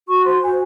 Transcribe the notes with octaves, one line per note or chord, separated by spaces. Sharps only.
F#4 C#6
C5 C6
F#4 G#5